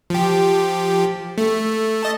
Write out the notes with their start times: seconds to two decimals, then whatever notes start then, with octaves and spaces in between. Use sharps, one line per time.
0.10 F3 G4
1.38 A3
2.03 D#5 A5